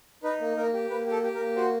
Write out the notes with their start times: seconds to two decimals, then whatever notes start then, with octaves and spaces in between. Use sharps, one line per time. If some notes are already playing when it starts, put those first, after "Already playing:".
0.23 D#4 B4
0.41 A#3
0.57 A#3 A#4
0.73 G4
0.90 A#3 B4
1.06 G4
1.11 A4
1.23 G4
1.34 A#4
1.40 A#3
1.56 F#4 C5